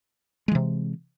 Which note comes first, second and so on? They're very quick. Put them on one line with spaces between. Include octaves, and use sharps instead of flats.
G#3 E3 C3